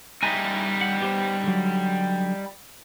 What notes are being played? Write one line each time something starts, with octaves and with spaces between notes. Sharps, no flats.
G3 D#4 E5 G#5
F#5
B3 G4 C5
D3 F#3